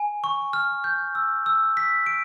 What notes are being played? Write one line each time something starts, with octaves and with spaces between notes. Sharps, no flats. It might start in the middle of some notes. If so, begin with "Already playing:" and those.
Already playing: G#5
C#6
F6
G6
E6
E6
B6
D7